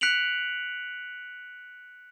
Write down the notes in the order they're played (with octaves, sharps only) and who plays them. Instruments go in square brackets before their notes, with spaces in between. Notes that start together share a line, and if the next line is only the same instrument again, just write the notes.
[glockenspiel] F#6 B6 C#7 D7 F7 F#7